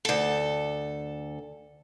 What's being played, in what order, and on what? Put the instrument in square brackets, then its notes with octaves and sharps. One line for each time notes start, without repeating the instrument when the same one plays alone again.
[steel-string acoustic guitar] D2 A4